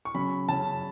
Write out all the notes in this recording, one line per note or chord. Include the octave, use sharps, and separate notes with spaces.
C#6
C#3 F#3 C#4 B5
C#3 F#3 C#4 A5